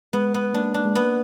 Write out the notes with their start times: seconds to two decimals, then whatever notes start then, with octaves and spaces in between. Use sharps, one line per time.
0.13 G#3 B3
0.34 B3
0.54 A#3 D4
0.74 D4
0.85 G#3
0.95 A#3 B3